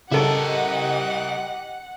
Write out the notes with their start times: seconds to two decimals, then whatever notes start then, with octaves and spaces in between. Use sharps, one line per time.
0.12 C#3 E4 G4 A4 A#4 D#5 F#5